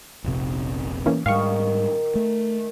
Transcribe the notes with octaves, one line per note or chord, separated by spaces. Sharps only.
F1 A#1 C3
E3 A#3 C#4
G#2 D#3 G3 F5 C#6
A3